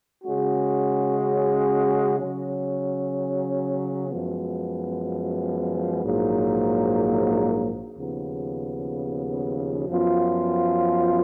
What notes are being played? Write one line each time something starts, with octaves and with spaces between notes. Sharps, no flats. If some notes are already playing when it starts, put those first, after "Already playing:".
C#3 G#3 C#4 F#4
C#3 F#3 C#4
F#2 F3 G#3 B3
A#1 G#2 F#3 A#3
D#2 C#3 F3 B3
F#2 F3 B3 F4